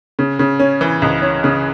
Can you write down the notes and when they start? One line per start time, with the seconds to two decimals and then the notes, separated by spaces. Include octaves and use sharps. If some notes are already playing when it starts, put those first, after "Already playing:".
0.19 C#3
0.39 C#3
0.59 C#4
0.81 E3
1.02 C#2
1.22 C#4
1.44 C#3